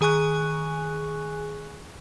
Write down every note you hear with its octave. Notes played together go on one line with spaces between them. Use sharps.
D#3 G#4 G#5 C#6 F#6